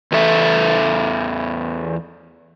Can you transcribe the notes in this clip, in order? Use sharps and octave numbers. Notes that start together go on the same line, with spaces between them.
E2 E3 A4 E5